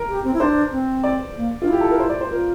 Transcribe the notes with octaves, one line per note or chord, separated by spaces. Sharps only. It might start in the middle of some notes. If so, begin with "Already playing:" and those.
Already playing: A#4
G4
C4
E4
D4 C5
C4
D5
A#3
D4 F4
E4 G4
A4
A#4
C5
D5
C5
F4 A#4